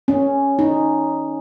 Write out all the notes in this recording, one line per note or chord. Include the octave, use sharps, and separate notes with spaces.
C#4
D#4